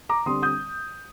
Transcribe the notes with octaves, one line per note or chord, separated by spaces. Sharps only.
A#5 D6
D3 G3 C4 C6 D#6
D#6 G6